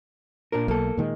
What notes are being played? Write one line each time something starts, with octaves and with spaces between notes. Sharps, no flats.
A#2 D4 A#4
B1 A#3 A4
A#2 D#3 G#3